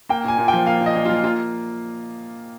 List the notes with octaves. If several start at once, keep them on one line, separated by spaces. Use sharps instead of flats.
A#3 G5
A#2 G#5
A#2
G5
F3
A#3 F5
A#2
D#5
A#2
F4
F3
A#3 F4